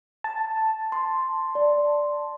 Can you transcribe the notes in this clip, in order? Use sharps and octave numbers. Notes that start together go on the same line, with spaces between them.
A5
C6
D5